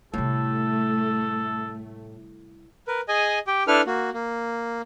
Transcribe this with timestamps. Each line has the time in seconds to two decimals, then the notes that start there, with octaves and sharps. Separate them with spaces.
0.14 A2 C3 G3 A3 A4
2.87 A#4 B4
3.08 G#4 D#5 G#5
3.47 G4 G5
3.67 D4 E4 A4 B4 F6
3.86 A#3 F#4
4.14 A#3